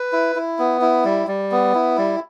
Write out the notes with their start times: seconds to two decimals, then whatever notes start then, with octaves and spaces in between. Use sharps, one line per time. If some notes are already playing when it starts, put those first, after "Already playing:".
Already playing: B4
0.13 E4
0.36 E4
0.59 B3
0.81 E4
1.04 G3
1.28 G3
1.52 B3
1.75 E4
1.98 G3